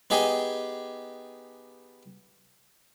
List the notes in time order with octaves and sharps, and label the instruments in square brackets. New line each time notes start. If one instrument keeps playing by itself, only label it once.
[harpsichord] B3 D#4 G4 G#4 D#5